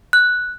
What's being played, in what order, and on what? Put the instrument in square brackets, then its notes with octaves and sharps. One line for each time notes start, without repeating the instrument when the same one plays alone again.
[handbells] F#6